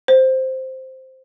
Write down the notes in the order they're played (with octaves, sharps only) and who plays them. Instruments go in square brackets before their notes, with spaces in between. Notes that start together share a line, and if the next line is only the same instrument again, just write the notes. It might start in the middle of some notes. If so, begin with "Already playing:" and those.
[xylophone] C5